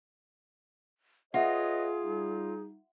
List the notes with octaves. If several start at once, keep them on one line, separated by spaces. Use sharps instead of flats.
F4 G#4 B4 C#5 D#5 E5 F#5
G3 D#4